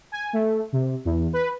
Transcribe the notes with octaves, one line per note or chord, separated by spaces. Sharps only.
G#5
A3
C3
E2
B4